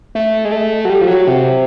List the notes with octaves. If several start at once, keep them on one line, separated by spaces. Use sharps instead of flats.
A3
G#3
A3
F#3
G3
F3
F#3
C3